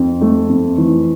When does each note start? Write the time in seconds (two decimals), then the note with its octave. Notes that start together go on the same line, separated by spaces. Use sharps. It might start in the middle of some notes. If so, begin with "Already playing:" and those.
Already playing: F2
0.21 A3
0.49 F2
0.77 E3